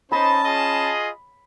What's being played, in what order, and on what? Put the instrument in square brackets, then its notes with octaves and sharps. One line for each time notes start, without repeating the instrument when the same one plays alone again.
[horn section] C#4 A5 [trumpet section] D#4 C5 D#5 [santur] B5
[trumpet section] F4 G#4 D#5